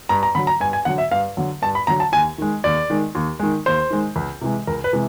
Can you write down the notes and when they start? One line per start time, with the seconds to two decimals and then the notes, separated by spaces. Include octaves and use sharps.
0.09 G2 A#5
0.23 A#5
0.35 D3 F#3 B5
0.47 A#5
0.60 G2 G#5
0.73 G#5
0.85 D3 F#3 F#5
0.98 E5
1.11 G2 F5
1.37 D3 F#3
1.62 G2 A5
1.75 B5
1.87 D3 F#3 A#5
2.00 A5
2.12 D#2 G#5
2.38 D#3 G#3
2.64 D#2 D5
2.90 D#3 G#3
3.15 D#2
3.40 D#3 G#3
3.66 D#2 C5
3.90 D#3 G#3
4.16 C#2
4.41 C3 E3 G#3
4.67 C#2 A#4
4.84 B4
4.93 C3 E3 G#3